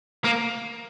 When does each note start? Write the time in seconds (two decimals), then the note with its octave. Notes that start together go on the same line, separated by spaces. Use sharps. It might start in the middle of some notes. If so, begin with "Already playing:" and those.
0.24 A#3